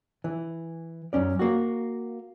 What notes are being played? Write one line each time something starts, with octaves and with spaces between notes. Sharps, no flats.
E3
F#2 A#2 C#4 D5
A#3 F#4